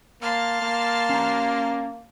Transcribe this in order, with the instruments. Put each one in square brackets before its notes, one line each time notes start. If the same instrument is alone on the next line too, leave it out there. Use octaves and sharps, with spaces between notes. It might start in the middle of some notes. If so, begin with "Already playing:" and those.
[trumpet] A#3 [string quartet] A5 C6 F6
[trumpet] A#3
[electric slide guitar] C#4 A#5